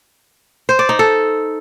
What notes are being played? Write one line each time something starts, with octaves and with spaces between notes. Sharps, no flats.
C5
D5
D#4
A4